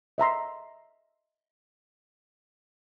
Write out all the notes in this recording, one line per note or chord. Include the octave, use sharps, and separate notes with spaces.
D#5 E5 A#5 C6